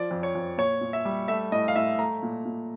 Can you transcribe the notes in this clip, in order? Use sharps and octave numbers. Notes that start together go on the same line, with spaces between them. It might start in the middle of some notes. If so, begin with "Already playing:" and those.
Already playing: F3 D5
F2
C#5
F2
A#2 C#5
A#2
E5
G3
A3 E5
A2 D#5
F5
A2 E5
A3 A#5
A#2
A#2